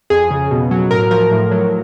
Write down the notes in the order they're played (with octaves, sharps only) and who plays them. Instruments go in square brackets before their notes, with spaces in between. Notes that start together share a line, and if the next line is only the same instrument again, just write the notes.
[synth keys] F2 G#4
C#3
B2
F#3
A2 A#4
F3 A#4
A2
F#3